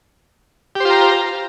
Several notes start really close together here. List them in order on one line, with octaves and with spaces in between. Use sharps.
G4 C5 F4 A#5